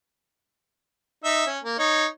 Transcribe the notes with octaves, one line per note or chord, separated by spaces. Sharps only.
D#4 E5
C#4
A#3
D#4 C#5